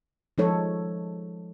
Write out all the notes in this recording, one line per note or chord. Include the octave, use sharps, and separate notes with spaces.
F3 G#3 D#4 A4 C#5